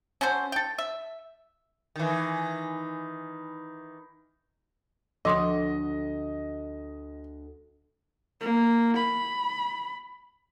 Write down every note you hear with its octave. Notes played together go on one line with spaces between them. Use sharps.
C#4 F#4 A4 C5
A4 G5
E5
D#3 E3
D2 F3 F#4 A4 D#5 C6 D#6
A#3
B5